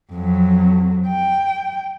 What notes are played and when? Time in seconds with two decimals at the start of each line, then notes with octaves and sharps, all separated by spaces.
0.13 F2 F#3
1.08 G5